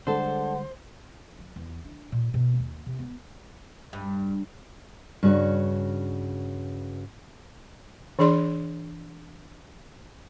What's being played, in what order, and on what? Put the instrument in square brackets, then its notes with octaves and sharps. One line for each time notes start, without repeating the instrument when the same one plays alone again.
[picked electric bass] D3 G3 G#3 [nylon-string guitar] D4 A4 [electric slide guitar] C5 [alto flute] F#5
[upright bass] F#3
E2
D4
A#2
B2
D#2
C3
B3
[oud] G2
[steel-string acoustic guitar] G2 C#3 F#4 C#5
[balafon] E3 D4 G#4 D5 C6